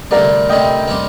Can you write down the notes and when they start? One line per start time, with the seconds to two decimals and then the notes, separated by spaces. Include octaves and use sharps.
0.11 D2 C3 G3 C4 A#4 D5
0.49 D2 C3 G3 C4 D#5 G5
0.87 C3 G3 C4